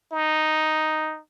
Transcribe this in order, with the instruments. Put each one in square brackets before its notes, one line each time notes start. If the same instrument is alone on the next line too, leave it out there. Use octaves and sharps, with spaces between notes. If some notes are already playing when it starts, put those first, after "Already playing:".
[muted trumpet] D#4